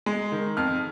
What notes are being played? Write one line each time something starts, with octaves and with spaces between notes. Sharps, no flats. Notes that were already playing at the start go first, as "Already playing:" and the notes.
G#3
D#3
F2 F6